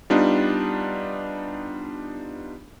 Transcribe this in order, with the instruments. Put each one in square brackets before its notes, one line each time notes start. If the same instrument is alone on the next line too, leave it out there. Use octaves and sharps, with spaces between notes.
[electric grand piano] G3 B3 D4 D#4 F4